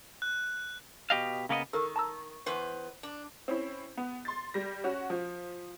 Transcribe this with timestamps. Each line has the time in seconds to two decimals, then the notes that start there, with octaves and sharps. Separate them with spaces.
0.22 F#6
1.10 B2 G4 D#5 F5
1.49 C#3 A#3 B3 D5 D#5
1.73 D#3 A4 A#4 E6
1.96 A5 A#5 E6
2.46 E2 B4 C5
3.03 D4
3.48 C4 C#4 E4
3.98 B3
4.25 C6 A6
4.54 G3 A#6
4.84 C#4 F#4
5.10 F3